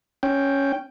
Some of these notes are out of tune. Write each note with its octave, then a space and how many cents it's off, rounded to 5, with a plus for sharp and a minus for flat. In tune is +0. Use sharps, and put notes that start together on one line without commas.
C#4 +0 G5 +0